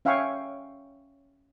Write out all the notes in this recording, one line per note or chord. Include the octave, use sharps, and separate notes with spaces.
C#4 E5 F5 G5 G#5 C#6